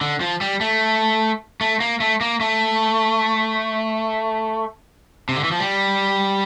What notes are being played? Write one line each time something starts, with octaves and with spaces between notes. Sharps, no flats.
D3
F3
G3
A3
A3
A#3
A3
A#3
A3
C3
D3
E3
F3
G3